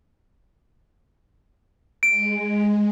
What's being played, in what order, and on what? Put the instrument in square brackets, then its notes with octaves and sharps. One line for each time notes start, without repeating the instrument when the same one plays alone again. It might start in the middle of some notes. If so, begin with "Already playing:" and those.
[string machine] G#3 [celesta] D7